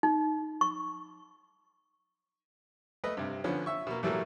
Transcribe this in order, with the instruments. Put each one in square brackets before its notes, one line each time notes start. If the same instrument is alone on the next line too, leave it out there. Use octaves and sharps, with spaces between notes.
[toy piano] D#4
C#6
[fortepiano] A3 B4 D#5
G2 C3
D3 F3 B3 C#4
E5 C#6
B2 A#3
A2 E3 F#3 G3 A3 A#3